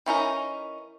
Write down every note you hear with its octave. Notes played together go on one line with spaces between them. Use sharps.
E3 C#4 D#4 A#4